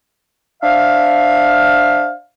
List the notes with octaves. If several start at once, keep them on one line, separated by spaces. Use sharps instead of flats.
D4 C5 E5 F5